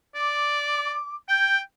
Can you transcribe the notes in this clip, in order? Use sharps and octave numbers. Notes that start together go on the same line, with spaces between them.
D5 D6
G5 G6